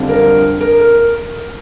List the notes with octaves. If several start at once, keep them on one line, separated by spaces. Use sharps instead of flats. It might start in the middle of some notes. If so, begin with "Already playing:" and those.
Already playing: F2 D3 G3 D4 F4
A#4
A#4
A#4